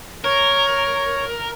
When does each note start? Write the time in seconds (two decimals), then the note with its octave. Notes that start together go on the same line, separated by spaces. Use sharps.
0.24 A#4 C#5